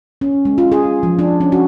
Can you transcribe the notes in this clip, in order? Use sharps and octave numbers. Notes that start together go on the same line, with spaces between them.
C#4
G#3
F4
G#4
F3
D4
C#4
F#4